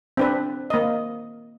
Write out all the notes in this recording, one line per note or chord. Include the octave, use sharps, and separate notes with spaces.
C4 D4 B4
A#3 D#5